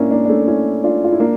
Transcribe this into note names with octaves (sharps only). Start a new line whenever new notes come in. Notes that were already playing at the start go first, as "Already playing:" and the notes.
Already playing: A#3 C#4 D4 E4
A#3 D4
D4
A3 C#4
C#4 E4
D4 F4
F4
E4
A#3 D4